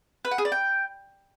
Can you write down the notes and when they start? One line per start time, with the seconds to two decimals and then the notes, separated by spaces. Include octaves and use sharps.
0.25 B4
0.31 F#5
0.38 G#4
0.45 D5
0.52 G5